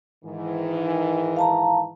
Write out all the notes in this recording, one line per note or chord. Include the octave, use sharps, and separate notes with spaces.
G#2 D#3 E3
F5 A5 A#5